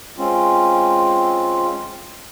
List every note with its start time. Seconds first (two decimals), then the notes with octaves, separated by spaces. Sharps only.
0.17 G#3 C4 C#4 F4